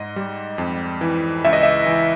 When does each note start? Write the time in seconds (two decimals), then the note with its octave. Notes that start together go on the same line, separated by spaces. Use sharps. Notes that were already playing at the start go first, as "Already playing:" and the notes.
Already playing: G#2 D#5
0.16 G3
0.58 F2
1.01 E3
1.45 C#2 E5
1.53 D#5
1.63 E5
1.86 E3